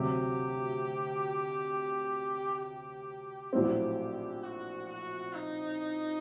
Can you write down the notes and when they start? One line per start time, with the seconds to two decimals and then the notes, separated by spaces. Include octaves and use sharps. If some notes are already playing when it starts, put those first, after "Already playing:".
Already playing: D2 C3 F#3 G4
2.62 G4
3.53 A#1 A2 F#3 C4
4.43 F#4
4.89 F#4
5.33 D#4